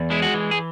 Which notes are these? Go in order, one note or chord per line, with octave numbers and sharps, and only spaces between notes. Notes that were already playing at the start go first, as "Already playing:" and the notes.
Already playing: E2
G#3 E4
F#4
E3
G#4